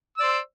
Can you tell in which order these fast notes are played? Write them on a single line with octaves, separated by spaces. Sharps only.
E6 D5 C5